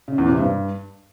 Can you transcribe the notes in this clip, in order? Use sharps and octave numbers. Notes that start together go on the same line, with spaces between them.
C#3
E2
C3
G2